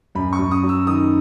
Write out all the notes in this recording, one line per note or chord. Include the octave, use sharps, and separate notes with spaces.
F#2 B5
C#6
F#2
D#6
F#3
E6
D#3 D#6